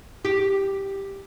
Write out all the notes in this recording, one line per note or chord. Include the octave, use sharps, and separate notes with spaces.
G4